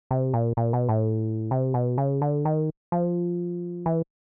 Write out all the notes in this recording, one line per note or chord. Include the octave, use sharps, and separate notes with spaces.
C3
A#2
A#2
B2
A2
C3
B2
C#3
D3
D#3
F3
E3